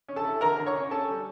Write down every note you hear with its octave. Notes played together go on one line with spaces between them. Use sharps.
C#4
A4 A5
E4
D3 A#4 A#5
D3
C#5 C#6
C#4
C#4 A4 A5
G3